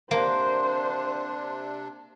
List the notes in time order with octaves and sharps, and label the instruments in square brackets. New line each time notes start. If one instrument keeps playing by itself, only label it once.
[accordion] C3 D4 [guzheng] A#3 [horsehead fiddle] C5